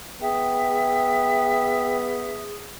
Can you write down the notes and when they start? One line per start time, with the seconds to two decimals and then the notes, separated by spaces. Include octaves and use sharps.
0.21 B3 G#4 E5 G5